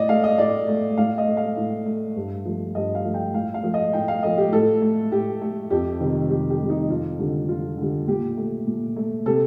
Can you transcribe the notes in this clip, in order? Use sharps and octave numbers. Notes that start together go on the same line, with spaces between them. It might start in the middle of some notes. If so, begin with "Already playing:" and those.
Already playing: A2 D5 D#5
A3 F5
D#5
A2 D5
A3
A2 F5
D#5
A3
F5
A2
A3
G2
F3 A3
G2 D#5
F5
F3 A3
G5
A2 F5
F5
F3 A3
D#5
A2 G5
F5
F3 A3 D#5
G4
A2 A4
A3
A2 G4
A3
F2 G4
C3 D#3 G3
F2 G4
G4
C3 D#3 G3
D#4
F2 F4
D3 G3
F2 F4
D3 G3
A#2 G4
A3
A#2
A3
C3 A4